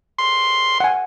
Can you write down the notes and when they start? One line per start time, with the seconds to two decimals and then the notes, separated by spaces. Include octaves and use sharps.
0.19 C6
0.80 F#5 G#5